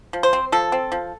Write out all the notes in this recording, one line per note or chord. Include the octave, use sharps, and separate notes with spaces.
F3
C5
C4
F3 A4
C4
F3